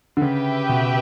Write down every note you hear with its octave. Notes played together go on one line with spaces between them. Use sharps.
D3
C#3 G4 B4 E5 G5
B2